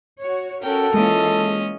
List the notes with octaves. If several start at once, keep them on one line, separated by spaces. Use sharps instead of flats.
F#4 C#5
C#4 F#4 A4 A#4 G5
E3 G#3 A#3 C#4 F4 D#5